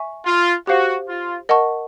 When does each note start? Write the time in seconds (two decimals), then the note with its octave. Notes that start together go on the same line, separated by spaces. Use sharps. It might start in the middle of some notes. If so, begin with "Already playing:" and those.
Already playing: E5 G#5 C#6
0.26 F4
0.67 F#4 G4 C5 F5
1.08 F4
1.49 A#4 D#5 F#5 A5 C#6